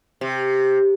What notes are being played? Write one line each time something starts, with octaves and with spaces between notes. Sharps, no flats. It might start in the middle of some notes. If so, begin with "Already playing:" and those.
C3